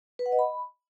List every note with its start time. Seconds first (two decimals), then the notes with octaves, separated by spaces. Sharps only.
0.19 B4
0.26 F#5
0.32 D#5
0.39 B5